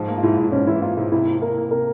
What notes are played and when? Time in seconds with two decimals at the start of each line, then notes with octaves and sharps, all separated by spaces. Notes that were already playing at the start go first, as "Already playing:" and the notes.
Already playing: G#2 F3
0.08 A#3
0.18 F4
0.23 G#2 E4
0.38 G#2
0.52 G#2 C#4
0.67 E3 E4
0.82 A#3 F4
0.97 G#2 E4
1.12 C3 E4
1.27 A#3
1.41 A#3 A#4
1.57 A#3
1.71 C3 A#4